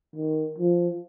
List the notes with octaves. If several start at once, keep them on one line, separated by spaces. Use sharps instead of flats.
D#3
F3